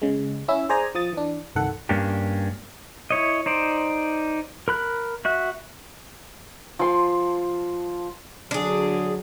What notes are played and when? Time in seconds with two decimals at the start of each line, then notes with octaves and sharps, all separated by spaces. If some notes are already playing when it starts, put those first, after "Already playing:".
0.02 C#3 G#3
0.48 C#4 E4 E5 E6
0.69 G#4 C5 D5 G#5 A#5
0.95 F3 D#6 A6
1.13 E3 D4
1.55 G1 C2 D#3 A4 F#5
1.89 G2 A#3 C#4 D4 G4
3.11 E4 C#5 D#5
3.46 D#4 C5 D5
4.68 A#4 B5 F#6
5.25 F#4 E5 F#6
6.79 F3 C6
8.51 D3 F#3 D4 G#4